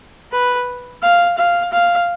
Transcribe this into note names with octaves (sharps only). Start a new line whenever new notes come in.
B4
F5
F5
F5